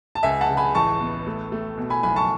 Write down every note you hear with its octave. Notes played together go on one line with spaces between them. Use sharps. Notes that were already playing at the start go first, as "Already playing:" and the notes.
A5
C#2 E5 G#5
F#5 A5
C#3
G#5 B5
A1 A5 C#6
B3
A3
A3
B2
G#5 B5
B1 G#5 B5
A5 C#6